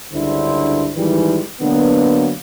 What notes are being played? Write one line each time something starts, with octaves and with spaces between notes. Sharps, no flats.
C#2 G2 D3 E4 C5
G#1 D#3 E3 G3 G#3 B4
B2 D3 F#3 A#3 B3